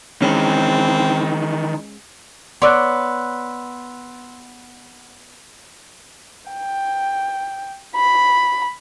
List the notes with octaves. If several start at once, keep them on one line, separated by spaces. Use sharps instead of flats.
D#3 E3 G#3 C4 C#4
B3 C#5 D5 C6 E6 F#6
G5
B5